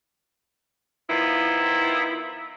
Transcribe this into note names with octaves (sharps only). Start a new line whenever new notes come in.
D#3 F3 B3 E4